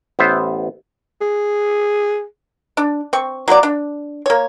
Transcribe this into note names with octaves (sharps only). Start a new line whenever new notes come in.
A1 B3 C5 E5
G#4
D4
C4 C#6
F#3 A#3 F#4 D5
D4
A#3 C#5